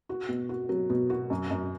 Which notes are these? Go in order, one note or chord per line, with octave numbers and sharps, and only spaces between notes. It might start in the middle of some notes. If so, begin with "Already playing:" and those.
F#4
B2
F#4
F#3
B2
F#4
F#2
F#2